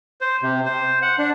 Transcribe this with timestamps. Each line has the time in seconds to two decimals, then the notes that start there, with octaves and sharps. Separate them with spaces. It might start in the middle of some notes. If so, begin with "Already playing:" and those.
0.21 C5
0.43 C3
0.65 C5
1.02 F#5
1.19 D4